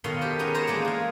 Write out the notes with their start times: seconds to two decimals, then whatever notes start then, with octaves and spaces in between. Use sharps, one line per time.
0.04 B2 D#3 A4 C#5 F5 C6
0.21 G4 C5
0.39 G#3 B3 C#4 D#4
0.54 G#4 C5 C#5 A5 A#5
0.67 E3 G#3 A#3 D5
0.85 G#4 F5